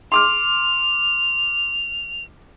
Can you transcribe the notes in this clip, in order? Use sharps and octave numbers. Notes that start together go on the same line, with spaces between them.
C6 D6 F6 F7